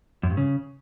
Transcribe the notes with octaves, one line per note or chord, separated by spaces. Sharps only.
F#2
G2
C#3